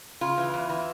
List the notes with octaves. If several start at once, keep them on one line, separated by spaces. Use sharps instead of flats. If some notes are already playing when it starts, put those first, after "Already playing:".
C#3 F4
E3
E2
E3